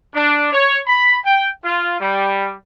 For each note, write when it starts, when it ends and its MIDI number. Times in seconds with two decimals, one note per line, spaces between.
0.14 0.51 62
0.53 0.79 73
0.87 1.17 83
1.25 1.50 79
1.64 1.97 65
2.00 2.53 55